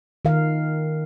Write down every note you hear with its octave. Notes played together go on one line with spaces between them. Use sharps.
D#3 A#4 F5